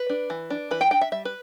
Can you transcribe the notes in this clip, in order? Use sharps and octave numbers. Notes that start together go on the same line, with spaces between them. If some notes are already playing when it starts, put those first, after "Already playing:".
Already playing: B4
D4
E3
D4
E3 B4
G5
D4 G5
E5
G3 E5
B4